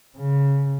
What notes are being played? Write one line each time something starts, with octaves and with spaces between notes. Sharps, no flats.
C#3